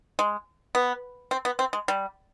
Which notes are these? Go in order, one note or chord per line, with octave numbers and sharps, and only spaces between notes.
G#3
B3
C4
B3
C4
G#3
G3